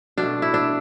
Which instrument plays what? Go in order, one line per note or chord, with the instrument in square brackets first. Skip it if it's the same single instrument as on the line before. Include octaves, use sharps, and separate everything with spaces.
[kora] B2 A3 D4
E4
D4